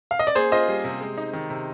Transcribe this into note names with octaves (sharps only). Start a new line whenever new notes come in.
F5
D#5
D5
A#3 G#4 C5
F4 C5 D#5
G3
C3
G#3
D#4
D#3
C3